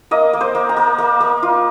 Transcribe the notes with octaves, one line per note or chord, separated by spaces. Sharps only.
A#3 D#5
A#3
C5
A#3
A#5
A#3
A#3
A#3
F4